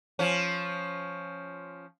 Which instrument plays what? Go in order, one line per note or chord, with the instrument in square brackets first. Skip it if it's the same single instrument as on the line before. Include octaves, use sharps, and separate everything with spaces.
[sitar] F3 C#4